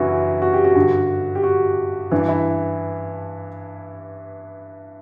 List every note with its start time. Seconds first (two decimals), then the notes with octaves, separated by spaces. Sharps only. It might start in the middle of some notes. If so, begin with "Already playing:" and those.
Already playing: F#2 C#3 E3 D4 E4 F#4
0.42 F#4
0.53 G4
0.64 F#4
0.75 G2 D3
1.35 G4
1.43 F#4
2.12 G2 E3 D4
2.28 E4